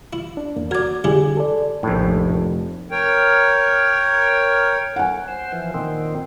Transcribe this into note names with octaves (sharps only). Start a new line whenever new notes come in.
E4
D4
E2 A#3
F#4 A#4 D5 G#6
D3 G3 E4 G4 G#4
A4 D5
F1 A#1 A2
A#4 C#5 G5
F#5 G#5
C5
E3 F3
A#2 D#3 C4